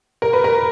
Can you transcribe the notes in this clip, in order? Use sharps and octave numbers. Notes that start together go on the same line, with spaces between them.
A#4
B4
A#4